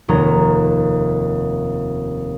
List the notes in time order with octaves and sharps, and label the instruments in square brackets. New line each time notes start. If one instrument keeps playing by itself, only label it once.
[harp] F1 D#2 C#4 A#5